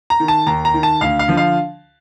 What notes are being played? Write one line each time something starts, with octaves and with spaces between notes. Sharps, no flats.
A#5
D#3
A5
D#2 A#5
A#5
D#3
A5
D2 F5
F5
D3 F3
F5